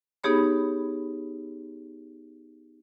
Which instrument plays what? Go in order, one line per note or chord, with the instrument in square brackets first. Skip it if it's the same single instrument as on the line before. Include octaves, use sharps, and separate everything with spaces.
[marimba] B3 D#4 G4 G#4 C#5 B5